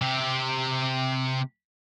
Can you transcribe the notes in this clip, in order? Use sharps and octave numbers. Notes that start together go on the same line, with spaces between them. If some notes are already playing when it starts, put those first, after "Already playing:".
C3 G4